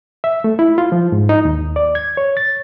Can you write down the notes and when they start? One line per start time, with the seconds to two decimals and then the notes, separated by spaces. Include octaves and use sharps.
0.24 E5
0.44 A3
0.59 E4
0.78 F4
0.92 F3
1.12 G#2
1.29 D#4
1.45 D#2
1.76 D5
1.95 G#6
2.17 C#5
2.37 A6